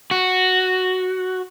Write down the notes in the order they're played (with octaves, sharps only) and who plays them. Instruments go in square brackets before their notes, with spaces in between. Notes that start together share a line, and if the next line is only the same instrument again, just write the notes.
[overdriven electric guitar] F#4